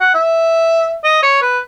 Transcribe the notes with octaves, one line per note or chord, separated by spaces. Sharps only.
F#5
E5
D#5
C#5
B4